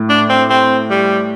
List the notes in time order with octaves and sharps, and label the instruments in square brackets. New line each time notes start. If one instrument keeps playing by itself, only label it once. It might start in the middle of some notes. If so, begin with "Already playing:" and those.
Already playing: [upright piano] A2
[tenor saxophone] D4
C4
C4
G3